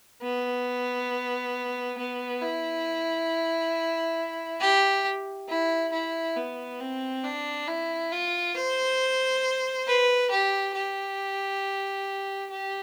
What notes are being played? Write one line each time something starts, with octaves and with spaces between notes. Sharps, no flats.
B3
B3
E4
G4
E4
E4
B3
C4
D4
E4
F4
C5
B4
G4
G4
G4